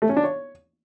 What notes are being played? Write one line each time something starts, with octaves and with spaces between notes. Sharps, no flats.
A3
C#4
D4
C#5